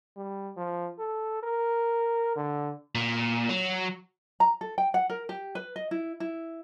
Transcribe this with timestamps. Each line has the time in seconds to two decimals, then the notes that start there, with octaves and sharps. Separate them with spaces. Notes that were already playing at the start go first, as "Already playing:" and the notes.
0.17 G3
0.57 F3
0.99 A4
1.43 A#4
2.36 D3
2.95 A#2
3.49 F#3
4.40 A#5
4.61 A4
4.78 G5
4.94 F#5
5.10 A#4
5.29 G4
5.55 B4
5.76 D#5
5.91 E4
6.20 E4